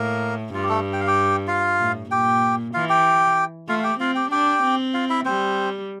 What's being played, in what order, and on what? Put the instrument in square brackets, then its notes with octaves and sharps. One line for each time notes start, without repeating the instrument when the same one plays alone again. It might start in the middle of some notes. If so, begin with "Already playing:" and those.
Already playing: [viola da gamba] A2 [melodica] A#3 A#4
[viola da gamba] G2 [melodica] F4
[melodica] G4
A3 A4
G5
F5
G4 G5
F4 F5
[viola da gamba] A2
[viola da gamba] A#2 [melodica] G4 G5
[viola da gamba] E3 [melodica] F4 F5
[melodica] G4 G5
[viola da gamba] A3 [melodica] F4 F5
[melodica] F5
G4 G5
[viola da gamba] C4 [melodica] F4 F5
[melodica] G4 G5
[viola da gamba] D4 [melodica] G4 G5
[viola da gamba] C4
[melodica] F4 F5
E4 E5
[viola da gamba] G3 [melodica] C4 C5